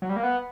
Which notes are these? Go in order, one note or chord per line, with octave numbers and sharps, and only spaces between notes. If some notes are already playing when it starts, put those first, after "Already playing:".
F#3
G3
A#3
B3